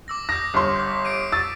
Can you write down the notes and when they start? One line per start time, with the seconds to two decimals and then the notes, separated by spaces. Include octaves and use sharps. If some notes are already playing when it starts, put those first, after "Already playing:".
0.08 D6 E6 A#6
0.29 D#6 G6 A#6
0.54 G1 C6
0.76 G6 B6
1.05 C7 D7 D#7
1.32 C#6 E6 A6